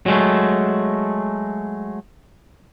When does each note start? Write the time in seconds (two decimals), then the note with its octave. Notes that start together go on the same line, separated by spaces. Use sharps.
0.06 F#3 G#3 A3